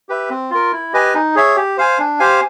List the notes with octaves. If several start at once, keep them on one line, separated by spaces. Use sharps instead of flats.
G4 B4 E5
C4
F4 A#4
E4
G4 B4 D#5 G#5
D#4
G#4 C#5 E5
G4
C5 F5 G#5
D4
G4 C5 F5 G#5